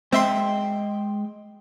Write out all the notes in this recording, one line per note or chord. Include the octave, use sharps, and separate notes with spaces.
G#3 C4 D#5 E5 G5 C6